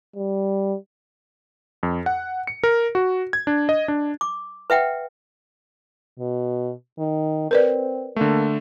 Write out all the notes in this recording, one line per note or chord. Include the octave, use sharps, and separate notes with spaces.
G3
F2
F#5
C#7
A#4
F#4
G#6
D4
D#5
D4
D6
B4 E5 F#5 G5
B2
D#3
C4 A#4 B4 D5
D3 A3 A#3